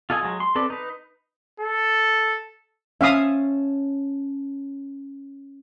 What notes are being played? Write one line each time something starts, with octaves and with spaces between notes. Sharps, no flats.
F4 A4 D#5 G#5
F#3 G#3
C6
C4 A4 B4 D5
D#4 B4
A4
C#4 C#5 E5 F5 A5 D#6